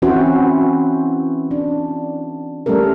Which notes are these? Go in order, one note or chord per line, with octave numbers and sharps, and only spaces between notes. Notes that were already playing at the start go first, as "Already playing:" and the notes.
E3 C4 C#4 E4 F#4 C5
D4
G3 A3 C#4 A4 A#4